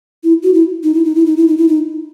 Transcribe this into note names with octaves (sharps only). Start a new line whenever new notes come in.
E4
F#4
E4
D#4
E4
D#4
E4
D#4
E4
D#4
E4
D#4